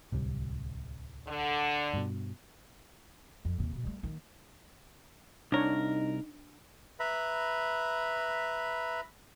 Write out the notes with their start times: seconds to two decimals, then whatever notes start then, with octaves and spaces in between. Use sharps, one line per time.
0.12 D1 C2 C3
1.27 D3
1.94 G2 B2
3.45 F2
3.58 D#2 C3
3.72 B2 D#4
3.83 G3 A3
4.03 D#3 A#3
5.52 C2 D4 D#4 A#4 C#5
7.00 B4 E5 A#5 B5